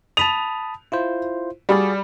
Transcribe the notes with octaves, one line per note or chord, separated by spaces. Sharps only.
A5 B5 D#6 F7
E4 F4 C5
G3 F#4 G#4 D5